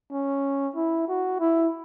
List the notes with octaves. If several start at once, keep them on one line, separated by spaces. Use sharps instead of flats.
C#4
E4
F#4
E4